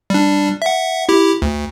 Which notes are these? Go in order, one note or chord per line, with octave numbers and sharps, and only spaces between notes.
G3 D4
E5 F#5
E4 G4
D2